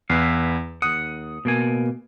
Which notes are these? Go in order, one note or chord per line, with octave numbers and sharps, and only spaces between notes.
E2 E4 B4 F5
D#2 F#5 D#6
B2 A#3 G#5